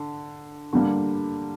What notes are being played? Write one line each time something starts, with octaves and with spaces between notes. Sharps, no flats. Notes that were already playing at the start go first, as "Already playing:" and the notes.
Already playing: D3
D3 G3 A#3